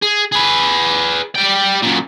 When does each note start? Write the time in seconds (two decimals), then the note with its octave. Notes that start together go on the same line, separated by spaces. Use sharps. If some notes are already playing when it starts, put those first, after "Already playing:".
0.02 G#4
0.32 G#4 B4
1.35 G3 G5
1.83 F#2 A#2